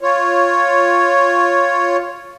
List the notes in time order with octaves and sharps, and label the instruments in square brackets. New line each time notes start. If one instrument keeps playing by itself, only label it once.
[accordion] F4 C#5